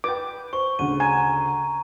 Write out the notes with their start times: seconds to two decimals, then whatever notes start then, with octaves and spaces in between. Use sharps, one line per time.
0.04 B4 G5 D6
0.53 C5 C#6
0.79 D2 C#3 D#7
1.00 G#5 A#5